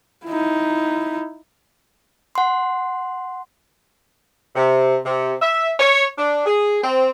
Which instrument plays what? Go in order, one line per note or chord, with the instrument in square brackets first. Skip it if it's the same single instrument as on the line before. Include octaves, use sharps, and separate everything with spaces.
[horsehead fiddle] D#4 E4
[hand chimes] F#5 C6
[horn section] C3
C3
E5
C#5
D4
G#4
C4